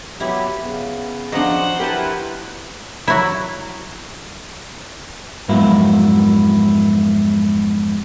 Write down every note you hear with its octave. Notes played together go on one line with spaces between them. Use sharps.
F#3 B3 E4 G4
C#3 B3
F3 F#3 D4 C5 D#5 F#5
E4 G4 A#4 B4 G5 A5
F#3 E4
F2 G#2 F#3 A#3 B3 E4